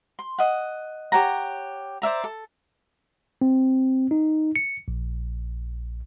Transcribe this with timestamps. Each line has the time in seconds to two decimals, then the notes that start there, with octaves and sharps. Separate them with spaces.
0.19 C6
0.38 D#5 F#5
1.12 G4 C#5 F#5 A#5
2.02 C5 D5 E5 A#5
2.24 A4
3.41 C4
4.11 D#4
4.56 C#7
4.88 A#1